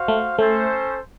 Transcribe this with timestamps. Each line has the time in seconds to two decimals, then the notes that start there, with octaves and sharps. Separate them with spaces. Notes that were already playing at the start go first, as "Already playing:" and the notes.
Already playing: F#4 C5 F5
0.08 A3
0.38 A3 C#4 A4 C5